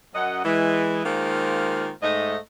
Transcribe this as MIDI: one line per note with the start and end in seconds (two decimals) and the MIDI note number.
0.14 0.42 42
0.14 0.42 75
0.14 0.42 78
0.44 1.02 52
0.44 1.02 56
1.05 1.90 51
1.05 1.90 56
1.05 1.90 58
1.05 1.90 65
1.05 1.90 70
1.05 1.90 72
2.03 2.36 44
2.03 2.36 57
2.03 2.36 75